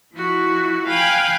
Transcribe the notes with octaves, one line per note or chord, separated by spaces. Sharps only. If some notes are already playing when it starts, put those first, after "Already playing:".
F3 E4 F#4
F5 G5 G#5 B5 F#6